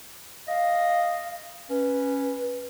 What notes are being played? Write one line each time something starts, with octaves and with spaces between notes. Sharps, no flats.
D#5 F5
C#4 B4